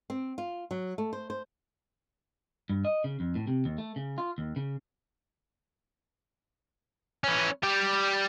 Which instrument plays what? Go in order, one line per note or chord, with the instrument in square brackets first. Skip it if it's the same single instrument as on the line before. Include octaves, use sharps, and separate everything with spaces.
[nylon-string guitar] C4
F4
F#3
A3
C5
C5
[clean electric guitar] G2
D#5
C#3
F2
A2
C3
D#2
A3
C#3
F4
D#2
C#3
[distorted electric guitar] E3 C#4
G3 G4